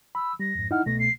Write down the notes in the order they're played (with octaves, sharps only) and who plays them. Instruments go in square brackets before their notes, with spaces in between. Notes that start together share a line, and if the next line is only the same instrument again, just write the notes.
[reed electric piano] B5 [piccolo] E6
[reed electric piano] G3 [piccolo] A#6
[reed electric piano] F2 G#2
[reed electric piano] D#4 E4 F#5 [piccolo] F6
[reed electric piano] C2 B2 A3 [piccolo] A#6
[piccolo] C7